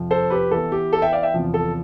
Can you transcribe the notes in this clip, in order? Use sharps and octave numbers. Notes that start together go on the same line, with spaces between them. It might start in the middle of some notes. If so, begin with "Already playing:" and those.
Already playing: F2 C3 F3
A4 C5
G4 B4
E3 B3 E4 A4
G4
A4
E5 G5
D5 F5
E5 G5
E2 C3 F3
A4